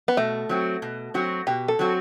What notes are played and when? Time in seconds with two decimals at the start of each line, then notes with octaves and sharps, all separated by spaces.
0.08 B3
0.17 B2 A3
0.49 F#3 C4 F#4
0.82 B2
1.14 F#3 C4 F#4
1.47 B2 G4
1.68 A4
1.79 F#3 C4 F#4